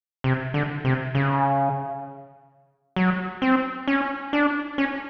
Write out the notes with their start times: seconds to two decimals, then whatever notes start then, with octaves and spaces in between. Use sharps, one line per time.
0.24 C3
0.54 D3
0.85 C3
1.15 C#3
2.96 F#3
3.42 C4
3.88 C#4
4.33 D4
4.78 C#4